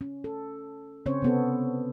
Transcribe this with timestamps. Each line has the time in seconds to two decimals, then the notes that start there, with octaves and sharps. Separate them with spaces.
0.01 C#4
0.24 A4
1.06 C#3 C4 C#4 C5 C#5
1.22 C3 B3 A4